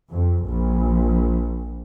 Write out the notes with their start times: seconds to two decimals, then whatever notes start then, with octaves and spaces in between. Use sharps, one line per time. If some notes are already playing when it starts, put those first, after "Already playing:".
0.10 F2
0.45 A#1